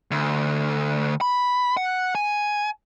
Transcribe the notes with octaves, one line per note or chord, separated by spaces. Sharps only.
D2
B5
F#5
G#5